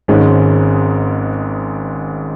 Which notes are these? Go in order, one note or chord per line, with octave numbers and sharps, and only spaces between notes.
G#1 G#2 G#3 C#4